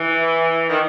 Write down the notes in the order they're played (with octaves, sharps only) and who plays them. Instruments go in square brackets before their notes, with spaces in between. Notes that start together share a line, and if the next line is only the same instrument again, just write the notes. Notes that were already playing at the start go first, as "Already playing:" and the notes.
Already playing: [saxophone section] E3
D#3